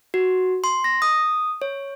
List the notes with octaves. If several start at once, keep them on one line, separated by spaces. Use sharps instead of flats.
F#4
C6
A#6
D#6
C#5